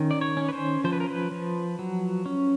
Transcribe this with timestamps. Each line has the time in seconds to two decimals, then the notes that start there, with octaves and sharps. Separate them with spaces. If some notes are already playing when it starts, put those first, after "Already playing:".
Already playing: D#3 C#4
0.11 D5
0.21 C#5
0.37 C#4
0.49 B4
0.53 C5
0.84 F3 C5
0.93 B4
1.00 A#4
1.09 B4
1.31 F3
1.79 F#3
2.26 C#4